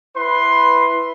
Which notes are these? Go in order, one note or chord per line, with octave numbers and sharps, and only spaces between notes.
E4 B4 C6